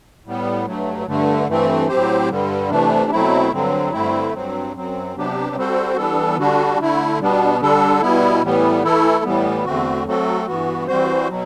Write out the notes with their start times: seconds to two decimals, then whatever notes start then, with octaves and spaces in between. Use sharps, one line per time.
0.25 A2 G3 B3
0.66 G2 F#3 A3
1.07 G2 D3 A3
1.47 G2 E3 A3 C4
1.88 A2 F#3 C4 G4 C5
2.29 G2 D3 G3
2.70 C3 E3 A3 D4
3.11 B2 F#3 A3 C4 E4
3.52 G2 D3 F#3 C4
3.92 G2 D3 A3 C4 E4
4.33 G2 F#3 C4
4.74 F#2 F#3 C4
5.16 C3 F#3 B3 D4 G4
5.56 G3 C4 F#4 A4 C5
5.96 E3 G3 B3 D4 A4
6.37 D3 G3 D4 F#4
6.79 D3 A3 E4
7.20 B2 G3 B3 D4
7.61 D3 G3 D4 A4
8.02 B2 G3 B3 E4
8.43 A2 E3 G3 B3
8.83 E3 A3 E4 A4
9.24 A2 E3 G3 B3
9.65 E2 D3 A3 C4 F#4
10.06 F#3 A3 C4 F#4 A4
10.47 G2 E3 B3 F#4
10.87 E3 G3 C4 F#4 C5
11.29 B2 F#3